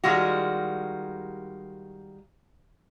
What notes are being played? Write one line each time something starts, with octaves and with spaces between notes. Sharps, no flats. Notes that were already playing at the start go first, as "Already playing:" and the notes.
D#3 G3 G#3 F4 F#4